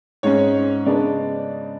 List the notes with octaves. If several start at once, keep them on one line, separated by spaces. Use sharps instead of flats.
G#2 G#3 C#4 C#5
C#3 G#3 B3 D4 D5